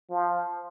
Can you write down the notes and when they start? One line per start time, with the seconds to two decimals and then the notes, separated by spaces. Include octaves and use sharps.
0.10 F3